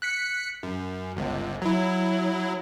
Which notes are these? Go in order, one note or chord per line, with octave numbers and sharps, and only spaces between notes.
F#6 B6 C#7
F#2
G1 C#2
F#3 E4